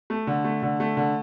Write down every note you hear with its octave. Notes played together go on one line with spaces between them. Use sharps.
A3
D3
A3
D3
A3
D3